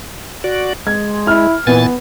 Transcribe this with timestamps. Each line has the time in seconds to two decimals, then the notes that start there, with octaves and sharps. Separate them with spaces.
0.44 F#4 D5
0.87 G#3 G#6
1.27 E4 F6
1.67 A#2 E3 B3 G#5 A6